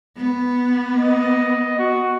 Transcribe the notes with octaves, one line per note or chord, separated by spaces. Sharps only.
B3
D#5
F#4